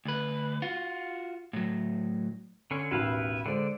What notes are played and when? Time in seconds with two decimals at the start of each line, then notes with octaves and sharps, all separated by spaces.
0.05 D2 B4
0.62 F4 F#4
1.53 A2 F#3
2.71 D3 C#4
2.91 A1 D#2 B2 E4 B4 F5
3.46 D3 G#3 C5 D5